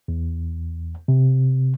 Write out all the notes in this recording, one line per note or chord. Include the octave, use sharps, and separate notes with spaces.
E2
C3